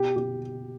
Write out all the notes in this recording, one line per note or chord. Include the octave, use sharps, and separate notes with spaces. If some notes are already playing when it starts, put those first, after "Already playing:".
Already playing: B2 G4
B2 G4